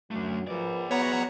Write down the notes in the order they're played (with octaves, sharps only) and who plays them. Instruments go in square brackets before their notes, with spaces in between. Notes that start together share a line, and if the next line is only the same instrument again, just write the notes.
[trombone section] F#2 F#3 [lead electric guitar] A3 D4
[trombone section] F3 A#4 B4 [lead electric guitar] G#4 D5
[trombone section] F#3 [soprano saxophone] B3 [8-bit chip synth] C#5 F#5 A#5